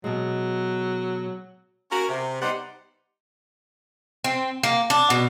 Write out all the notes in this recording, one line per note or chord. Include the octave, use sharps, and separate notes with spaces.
B2 F#3 G#3
C#4 F#4 A#4
C3
G3 B3 D#4 G4 C5 F#5
C4
A#3
D4
B2